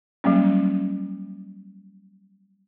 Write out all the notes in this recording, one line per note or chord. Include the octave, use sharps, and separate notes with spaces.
F#3 G3 A#3 C#4